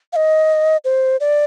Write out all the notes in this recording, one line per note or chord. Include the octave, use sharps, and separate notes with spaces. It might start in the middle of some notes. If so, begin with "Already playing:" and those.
F5
D#5
C5
D5